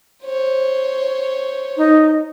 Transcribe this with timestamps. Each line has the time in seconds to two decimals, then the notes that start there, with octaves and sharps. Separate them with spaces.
0.23 C5 C#5
1.76 D#4